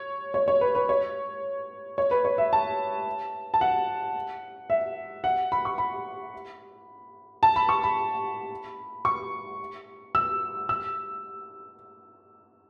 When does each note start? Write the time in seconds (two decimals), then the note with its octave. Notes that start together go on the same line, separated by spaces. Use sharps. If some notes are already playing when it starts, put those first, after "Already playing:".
Already playing: C#5
0.34 C#5
0.48 C#5
0.61 B4
0.75 B4
0.89 C#5
1.98 C#5
2.11 B4
2.25 C#5
2.38 E5
2.53 A5
3.54 A5
3.61 F#5
4.70 E5
5.24 F#5
5.52 B5
5.65 C#6
5.78 B5
7.43 A5
7.56 B5
7.69 C#6
7.83 B5
9.05 C#6
10.15 E6
10.69 E6